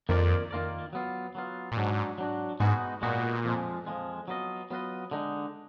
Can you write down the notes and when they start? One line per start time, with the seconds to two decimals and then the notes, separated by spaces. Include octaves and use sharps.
0.09 F2 D#3 A#3 F4 A#4 D5
0.51 D#3 A#3 F4 A#4 D5
0.93 F#3 B3 F4
1.35 F#3 B3 F4
1.72 A#2
1.77 G#2 F#3 D4 F#4
2.18 F#3 D4 F#4
2.60 G#2 G#3 B3 D#4 F#4
3.02 A#2 G#3 B3 D#4 F#4
3.45 F2 F3 G#3
3.87 F2 F3 G#3
4.28 F#3 B3 F4 B4 D#5
4.71 F#3 B3 F4 B4 D#5
5.11 D3 G#3 D#4